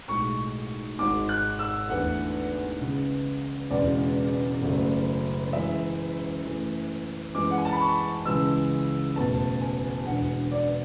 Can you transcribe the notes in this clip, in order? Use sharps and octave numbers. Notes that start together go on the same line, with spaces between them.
B1 A2 G#3 C#6
G#1 G#2 G#3 D6
F#6
E6
E2 D3 A3 F#5
C#2 C#3 G#3
E1 E2 C#3 G#3 D5
F#1 F#2 C#3 F#3 A3
F#2 E3 G#3 E5
F#2 E3 A3
F#2 E3 G#3 D6
F#5
G#5
A5
B5
C#6
C#2 C#3 E3 G#3 E6
F#1 E2 B2 A3 A5
G#5
E1 E2 D3 F#5
D5